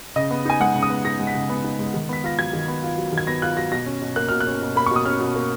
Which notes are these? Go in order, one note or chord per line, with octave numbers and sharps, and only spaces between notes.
C#3 D#5
B3
D#4 G#5
G#3 F#5
C#3
D#6
B3
D#4 A#6
G#3
B6
C#3
B3
D#4
G#3
D#3
B3 B6
F4 A#6
F#3 G#6
D#3
B3
F4
F#3
D#3
G#6
B3 A#6
F4 F#6
F#3 A#6
B2 A#6
C#4
B2
A#3 F#6
B2 F6
F#6
C#4
B2
A#3 B5
B2 C#6
D#6
C#4 F6
B2
A#3